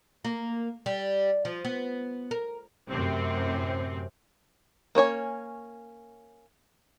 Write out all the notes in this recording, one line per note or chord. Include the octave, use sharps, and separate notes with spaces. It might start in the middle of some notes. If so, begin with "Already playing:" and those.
A#3
G3
F3
B3
A#4
F#2 A2 C3 C4
A#3 C#4 C#5 G#5